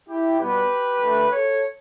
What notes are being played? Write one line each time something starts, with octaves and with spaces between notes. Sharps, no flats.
E4 G4
B2 G3 B3 G4 B4
D3 A3
A4 C#5